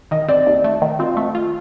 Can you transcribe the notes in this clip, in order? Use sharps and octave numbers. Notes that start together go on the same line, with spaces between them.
D#3 D#5
C4 D5
D#2
A3
D#3
C4 F4
A3
F4